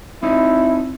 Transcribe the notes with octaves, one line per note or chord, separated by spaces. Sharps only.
C4 D#4 E4